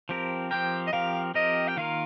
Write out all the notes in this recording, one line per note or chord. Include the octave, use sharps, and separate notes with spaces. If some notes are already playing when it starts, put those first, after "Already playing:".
F3 C4 G4 A#4
F3 C4 G4 A#4 G5
D#5
F3 C4 G4 A#4 F5
F3 C4 G4 A#4 D#5
G5
D#3 A#3 F4 A#4 F5